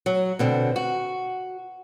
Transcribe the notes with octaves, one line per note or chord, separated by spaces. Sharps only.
F#3
B2 D3 C4
F#4